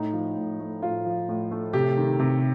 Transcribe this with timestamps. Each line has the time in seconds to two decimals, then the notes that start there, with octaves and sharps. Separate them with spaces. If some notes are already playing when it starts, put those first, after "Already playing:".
Already playing: A2 D#4
0.13 F3
0.37 A2
0.60 A3
0.82 A2 F4
1.05 F3
1.29 A2
1.51 A3
1.73 C3 G4
1.97 D#3
2.19 C3